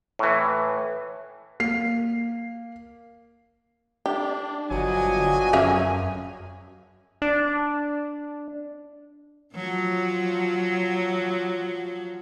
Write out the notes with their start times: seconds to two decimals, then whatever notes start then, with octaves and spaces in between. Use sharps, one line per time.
0.19 A2 E3
1.60 A#3 C7
4.06 D4 G4
4.71 G1 B2 F3 F#3 D4 D#5 G#5
5.53 F#2 C#4 E5 F5
7.22 D4
9.55 F3 F#3